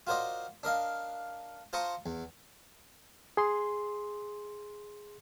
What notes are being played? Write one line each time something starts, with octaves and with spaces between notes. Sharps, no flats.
F4 F#4 A#4 C5 D5 D#5
D4 A#4 D#5 F5
F4 C5 A5 A#5 C#6 D#6
E2
G#4 C6